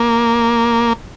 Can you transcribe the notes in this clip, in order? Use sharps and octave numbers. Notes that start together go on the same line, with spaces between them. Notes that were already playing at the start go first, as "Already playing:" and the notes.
Already playing: A#3